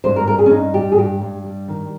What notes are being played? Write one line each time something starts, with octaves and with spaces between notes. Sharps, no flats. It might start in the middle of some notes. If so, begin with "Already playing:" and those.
G2 C5
A#4
G2 A#4
G#4
C#4
G2 D#4
G3 G4
G#4
G2 G4
G2
G3
D#3